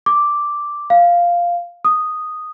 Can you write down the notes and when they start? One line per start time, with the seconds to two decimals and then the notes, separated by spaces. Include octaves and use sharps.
0.06 D6
0.90 F5
1.85 D#6